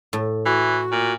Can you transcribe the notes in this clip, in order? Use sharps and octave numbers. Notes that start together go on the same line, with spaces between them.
A2
E3 F#4
A#2